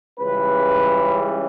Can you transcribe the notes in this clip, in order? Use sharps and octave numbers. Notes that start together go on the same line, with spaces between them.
C#2 C#3 E3 G3 B4